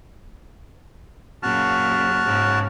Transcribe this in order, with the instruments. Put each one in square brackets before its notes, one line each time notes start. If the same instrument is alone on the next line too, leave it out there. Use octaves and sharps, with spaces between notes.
[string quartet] F#2 A#2 C#3 [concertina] F#4 A5 F6
[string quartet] G#2 C#3